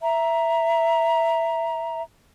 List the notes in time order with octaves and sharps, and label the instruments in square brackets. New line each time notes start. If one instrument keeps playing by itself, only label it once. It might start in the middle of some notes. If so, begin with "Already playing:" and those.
[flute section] E5 A#5